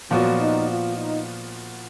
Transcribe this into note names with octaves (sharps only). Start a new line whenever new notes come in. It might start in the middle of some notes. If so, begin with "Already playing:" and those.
A#2 F3 F#3 B3 F#4
D#4
F4
D#4